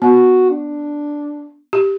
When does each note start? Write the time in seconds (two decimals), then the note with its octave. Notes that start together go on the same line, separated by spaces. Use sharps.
0.02 B3 F#4
0.50 D4
1.73 G4